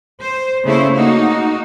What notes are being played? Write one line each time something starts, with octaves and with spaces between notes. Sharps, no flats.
C5
C#3 A3 A#3 E4 C5
A#3 D#4 F#4